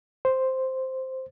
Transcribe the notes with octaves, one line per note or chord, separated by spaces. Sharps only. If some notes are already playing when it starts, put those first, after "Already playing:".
C5